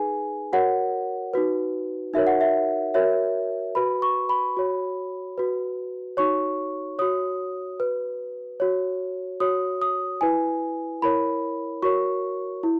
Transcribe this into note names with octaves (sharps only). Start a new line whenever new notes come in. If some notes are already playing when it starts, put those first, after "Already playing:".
Already playing: D#4 G#4 B4 G#5
F#4 A#4 C#5 F#5
D#4 F#4 B4
D#4 F#4 A#4 C#5 E5
F#5
E5
F#4 A#4 C#5 E5
F#4 B4 B5
C#6
B5
F#4 C#5
F#4 B4
D#4 F#4 C#5 C#6
F#4 C#5 D#6
F#4 B4
F#4 C#5
F#4 C#5 D#6
D#6
E4 B4 G#5
E4 A#4 C#5 B5
F#4 A#4 C#5 C#6
E4